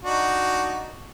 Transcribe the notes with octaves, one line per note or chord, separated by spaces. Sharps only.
D4 D#4 F#4